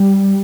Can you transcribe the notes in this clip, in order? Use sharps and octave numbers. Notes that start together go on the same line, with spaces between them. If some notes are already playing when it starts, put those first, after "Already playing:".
Already playing: G3